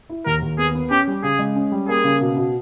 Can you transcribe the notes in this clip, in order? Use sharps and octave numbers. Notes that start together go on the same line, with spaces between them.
E4
D#2 A#4
D#2
B3 G#4
B3
C#4 G4
G3
C#3 G#4
G#3
C#4
G3
A#3 G#4
C#3
B2
B2